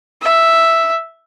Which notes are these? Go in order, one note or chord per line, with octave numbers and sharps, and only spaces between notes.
E5